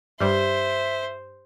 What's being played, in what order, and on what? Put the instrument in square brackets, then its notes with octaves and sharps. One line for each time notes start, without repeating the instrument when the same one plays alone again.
[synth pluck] G2 G3 [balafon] G4 [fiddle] C5 [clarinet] E5